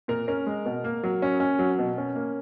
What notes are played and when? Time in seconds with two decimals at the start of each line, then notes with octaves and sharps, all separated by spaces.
0.08 A#2 A#4
0.28 C#4 A#4
0.46 G#3
0.66 B2
0.84 A#3
1.03 F#3
1.22 C#4
1.40 C#4
1.59 F#3
1.79 B2
1.98 C#4
2.16 A#3